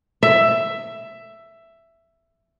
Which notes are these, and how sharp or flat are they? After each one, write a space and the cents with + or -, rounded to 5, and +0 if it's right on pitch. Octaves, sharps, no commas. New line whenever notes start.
E5 +10